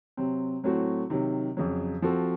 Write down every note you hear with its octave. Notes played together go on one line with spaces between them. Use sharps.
C3 F#3 C4
A2 F#3 A3 C4 F#4
C3 D#3 F#3
F2 C#3 F#3
F3 C4 F#4 A4